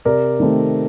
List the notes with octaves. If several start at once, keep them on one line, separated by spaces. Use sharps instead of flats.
C3 A#4 D5
D#3 A3 C4